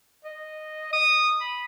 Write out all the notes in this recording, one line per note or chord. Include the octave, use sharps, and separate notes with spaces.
D#5
D#6
B5